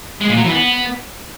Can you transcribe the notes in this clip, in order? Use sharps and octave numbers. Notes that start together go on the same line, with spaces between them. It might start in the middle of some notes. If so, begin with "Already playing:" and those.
G#3
A#2
F#3
E3
B3